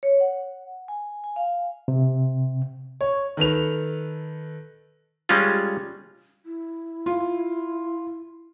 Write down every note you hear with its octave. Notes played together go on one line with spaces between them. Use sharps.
C#5
F#5
G#5
G#5
F5
C3
C#5
D#3 A4 B4 F7
G3 G#3 C#4 F4
E4
F4